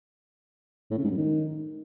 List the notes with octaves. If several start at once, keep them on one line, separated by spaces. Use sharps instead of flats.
A2
C#3
G#2
F#2
D#3